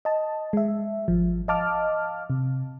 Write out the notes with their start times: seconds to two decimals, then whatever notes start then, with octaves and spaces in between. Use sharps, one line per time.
0.05 D#5 A5
0.53 G#3 E5
1.08 G#1 F3
1.48 D#5 F5 A5 D6 F6
2.30 C3